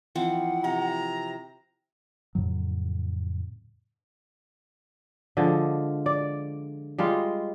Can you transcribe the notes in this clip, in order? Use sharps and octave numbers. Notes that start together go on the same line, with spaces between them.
E3 F3 C4 F#5
C3 A#5
F2 A2 C#3 F#3
D3 F3 G#3
D5
G3 G#3 F4